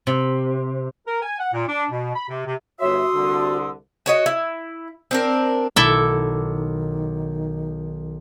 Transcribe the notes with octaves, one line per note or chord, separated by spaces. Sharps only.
C3
A#4
G#5
F#5
A#2
D4
B2
B5
C3
C3
G1 F#4 C#5 E5 C6 D#6 E6
C2 D3
F#4 C#5 D#5
E4
C4 D4 A#4
B1 D#3 E4 A4 E5 D6